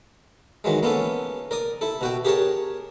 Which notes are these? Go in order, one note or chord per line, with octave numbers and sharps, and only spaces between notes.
D#3 E3 F#3 G#3
A#3 B3 C#4 A4
A#4 D5 D#6
E4 A4
B2 F#4 G5
G4 G#4 A#4 C#5 A5